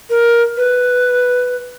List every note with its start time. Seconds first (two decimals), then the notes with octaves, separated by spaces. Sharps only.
0.10 A#4
0.57 B4